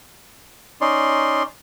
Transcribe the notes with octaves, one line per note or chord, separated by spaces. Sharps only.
C#4 D#4 D5 C6